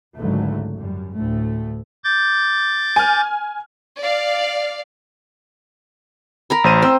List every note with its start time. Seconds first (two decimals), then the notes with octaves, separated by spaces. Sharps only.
0.17 G#1 C#2 D3 F#3 A3
0.76 F#2 G3
1.13 D2 A2 A3
2.04 D6 G6 A6
2.96 G#5 F6
4.00 D5 F5
6.50 A#4 A#5 B5
6.64 A1 C5 D#7
6.82 C4 C5 E6